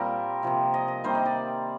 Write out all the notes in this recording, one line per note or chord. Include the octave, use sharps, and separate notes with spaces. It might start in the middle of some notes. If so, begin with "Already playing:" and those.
Already playing: A#2 G3 A#3 C4 A#4
C3 F3 A#3
D#5
D#5
C3 D#3 G3 A#3 C5
D#5
D5